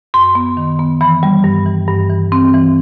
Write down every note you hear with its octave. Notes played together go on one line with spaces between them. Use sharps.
F#2 C6
B3
D#3
B3
E3 B5
G3
G2
E3
G2
E3
C4
E3